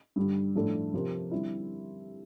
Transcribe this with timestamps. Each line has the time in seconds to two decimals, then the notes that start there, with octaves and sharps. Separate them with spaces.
0.16 G2 D3 G3
0.55 A2 F3 A3 D4 A4
0.94 C3 F3 C4 G4 A#4
1.31 D3 G3 C4 E4